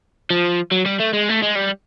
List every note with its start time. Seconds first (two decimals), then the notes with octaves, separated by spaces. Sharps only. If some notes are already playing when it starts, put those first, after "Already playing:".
0.30 F3
0.72 F#3
0.86 G3
1.00 A3
1.14 G#3
1.29 A3
1.43 G#3
1.56 G3